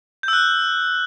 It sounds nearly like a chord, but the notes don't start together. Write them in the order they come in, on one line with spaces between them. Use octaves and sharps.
G6 E6 F#6